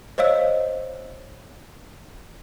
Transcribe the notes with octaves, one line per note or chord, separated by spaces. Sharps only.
C5 C#5 D#5 F5 E6